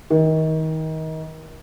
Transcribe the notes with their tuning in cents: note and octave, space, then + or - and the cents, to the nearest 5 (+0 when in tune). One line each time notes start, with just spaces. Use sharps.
D#3 +30